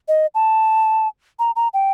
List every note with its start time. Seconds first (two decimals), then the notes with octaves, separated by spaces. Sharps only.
0.08 D#5
0.35 A5
1.39 A#5
1.56 A#5
1.74 G5